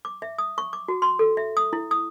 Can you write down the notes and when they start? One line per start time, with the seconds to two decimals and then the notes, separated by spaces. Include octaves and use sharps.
0.05 D6
0.22 E5
0.38 D#6
0.58 C#6
0.73 D6
0.88 F#4
1.02 C6
1.19 A4
1.37 E5
1.57 D#6
1.73 E4
1.91 D#6